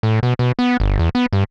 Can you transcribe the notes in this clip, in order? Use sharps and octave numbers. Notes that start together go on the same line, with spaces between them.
A2
B2
B2
B3
G1
E2
B3
G2